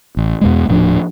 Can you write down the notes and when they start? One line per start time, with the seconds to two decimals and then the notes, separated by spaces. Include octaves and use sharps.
0.17 A1
0.41 E2 B2 G#3
0.69 D#1 A2 F3 D4